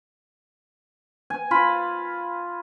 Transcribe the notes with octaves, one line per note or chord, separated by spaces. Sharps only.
G#5
F4 B5